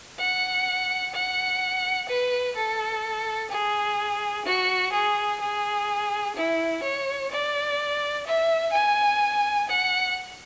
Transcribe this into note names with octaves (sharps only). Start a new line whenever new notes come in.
F#5
F#5
B4
A4
G#4
F#4
G#4
G#4
E4
C#5
D5
E5
G#5
F#5